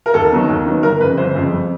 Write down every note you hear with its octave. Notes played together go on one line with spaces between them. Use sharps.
A#4
D#2 A4
D#3 F#3 B3
D#2
D#3 F#3 B3
G1 A#4
F2 C#3 B4
G1 C5
F2 C#3
F2